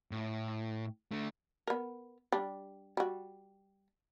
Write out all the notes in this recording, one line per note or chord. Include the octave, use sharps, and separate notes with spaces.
A2
D3 A3
B3 A#4
G3 D4
G3 F#4